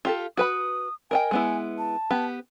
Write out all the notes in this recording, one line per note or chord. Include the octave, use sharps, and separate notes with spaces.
F4 G4 A4
F#4 B4 B5 D#6
A#4 D#5 G5 G#5
G#3 B3 E4
A5
B3 G4 B4